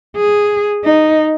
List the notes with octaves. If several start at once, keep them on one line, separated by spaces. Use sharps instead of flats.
G#4
D#4